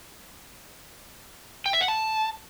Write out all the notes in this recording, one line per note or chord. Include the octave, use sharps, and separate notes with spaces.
G5
E5
F#5
A5